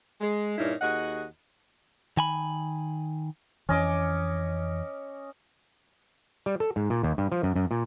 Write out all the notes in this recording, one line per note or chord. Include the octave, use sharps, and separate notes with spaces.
G#3
G2 A#2 C#4 D#4 E4
D#2 F#4 G#4 D#5 F#5
D#3 G#5 B5
F2 E3 C#4 D#5 D6
G3
A4
G#2
A#2
D#2
G2
F3
F#2
F#2
A#2